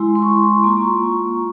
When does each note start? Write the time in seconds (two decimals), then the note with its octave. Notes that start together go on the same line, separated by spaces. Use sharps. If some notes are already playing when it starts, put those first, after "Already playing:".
Already playing: G#3 E4 C6
0.15 C6
0.22 C#6
0.43 C6
0.64 A#3 F4 A#5
0.84 C#6